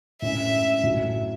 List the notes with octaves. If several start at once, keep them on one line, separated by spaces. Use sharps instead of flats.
A2 G#3 C#4 E5
A2 F#3